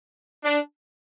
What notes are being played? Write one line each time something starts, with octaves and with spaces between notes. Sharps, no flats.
D4